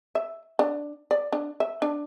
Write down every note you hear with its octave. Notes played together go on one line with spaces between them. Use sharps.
E5
D4
D5
D4
E5
D4